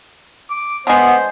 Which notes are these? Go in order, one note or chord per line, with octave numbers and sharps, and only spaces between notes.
D6
D3 G#3 B3 C5